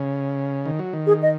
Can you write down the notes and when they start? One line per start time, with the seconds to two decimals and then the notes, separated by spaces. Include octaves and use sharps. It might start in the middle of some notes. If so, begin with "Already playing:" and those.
Already playing: C#3
0.66 D#3
0.79 F#3
0.93 D#3
1.07 G#4
1.22 D#5